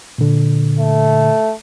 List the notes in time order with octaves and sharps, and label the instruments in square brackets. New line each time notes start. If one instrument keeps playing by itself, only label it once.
[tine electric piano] A#2 D3
[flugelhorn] A3